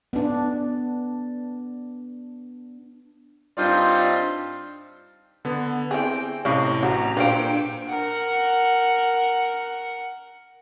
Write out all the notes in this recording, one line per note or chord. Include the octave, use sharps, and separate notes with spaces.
B3 D4
G2 C4 D#4 F4 C5 D5
D3 B3
E3 C4 G#4 G5
A2 C3 C#4 D#5 F5
A1 F#4 A#5
A#2 D4 B4 C5 F5 G5 D7
A#4 F#5